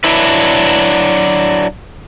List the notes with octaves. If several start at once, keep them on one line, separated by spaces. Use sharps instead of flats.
F#3 D4 E4 B4